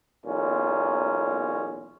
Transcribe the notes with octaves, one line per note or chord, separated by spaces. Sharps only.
B1 E2 A#2 C#4